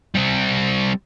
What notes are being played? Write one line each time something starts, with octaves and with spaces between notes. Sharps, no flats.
G3 C4